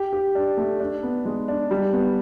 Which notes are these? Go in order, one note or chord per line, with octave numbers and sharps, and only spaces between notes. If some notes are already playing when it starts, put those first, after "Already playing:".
Already playing: G4
G4
D4
A3
D4
B3
G#3
D4
G3
B3